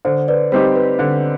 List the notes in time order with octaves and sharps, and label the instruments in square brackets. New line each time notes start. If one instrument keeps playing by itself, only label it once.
[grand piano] D3 [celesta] C5
[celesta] B4 D5
[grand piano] G3 C4 D#4 G4 [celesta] C5
[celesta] B4
[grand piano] D3